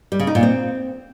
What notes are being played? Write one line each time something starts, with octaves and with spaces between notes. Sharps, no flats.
G3
C#3
D#4
A#2
C4